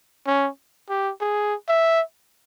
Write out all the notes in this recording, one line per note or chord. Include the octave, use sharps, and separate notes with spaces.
C#4
G4
G#4
E5